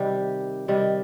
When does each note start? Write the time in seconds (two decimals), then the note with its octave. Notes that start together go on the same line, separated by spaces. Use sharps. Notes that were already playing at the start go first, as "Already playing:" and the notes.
Already playing: C3 D#3 G3 G4
0.68 C3 D#3 G3